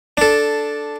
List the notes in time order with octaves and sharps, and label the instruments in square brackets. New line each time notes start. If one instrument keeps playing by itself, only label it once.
[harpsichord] D4 A4